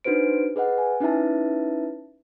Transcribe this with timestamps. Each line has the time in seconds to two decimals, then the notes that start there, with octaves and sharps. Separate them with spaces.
0.04 D4 D#4 F#4 B4 C5 D7
0.56 G#4 B4 D#5 F#5
0.78 G#5
1.00 C#4 D#4 E4 B4 E5 A5